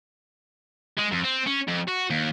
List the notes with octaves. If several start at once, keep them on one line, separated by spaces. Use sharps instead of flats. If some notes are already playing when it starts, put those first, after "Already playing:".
G#3
F2
C4
C#4
F2
F#4
D#2